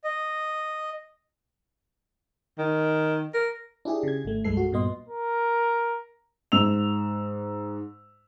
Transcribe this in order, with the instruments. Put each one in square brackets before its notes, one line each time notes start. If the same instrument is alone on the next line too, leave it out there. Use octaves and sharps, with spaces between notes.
[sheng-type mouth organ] D#5
[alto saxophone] D#3
A#4
[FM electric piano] D4 E4 G4 G#4
C#3 G#6
G#1 A3
C2 G2 G#3 A4 C7
F#4
G2 A#2 B3 D#5 C6
[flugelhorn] A#4
[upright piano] G#2 E6 F7